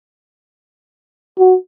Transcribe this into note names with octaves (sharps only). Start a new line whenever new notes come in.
F#4